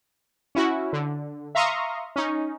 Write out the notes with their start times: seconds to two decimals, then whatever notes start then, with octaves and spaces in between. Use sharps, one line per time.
0.55 C#4 E4 F#4
0.93 D3
1.55 E5 F5 A#5 C6 C#6 D#6
2.16 C#4 D#4